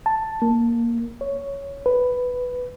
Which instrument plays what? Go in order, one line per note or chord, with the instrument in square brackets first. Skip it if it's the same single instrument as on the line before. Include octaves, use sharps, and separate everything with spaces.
[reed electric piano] A5
A#3
C#5
B4